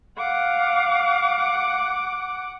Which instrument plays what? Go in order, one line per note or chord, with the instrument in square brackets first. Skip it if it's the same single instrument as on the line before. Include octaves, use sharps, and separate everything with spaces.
[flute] F5 [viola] F#5 D6